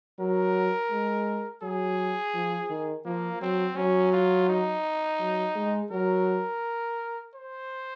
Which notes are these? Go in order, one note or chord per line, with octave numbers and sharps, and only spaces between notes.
F#3 A#4
G#3
F#3 G#4
F3
D#3
F3 A#3
F#3 C4
F#3 C#4
F4
D#4
F#3
G#3
F#3 A#4
C5